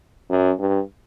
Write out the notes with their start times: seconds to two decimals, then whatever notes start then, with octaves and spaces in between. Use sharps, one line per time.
0.30 F#2
0.59 G2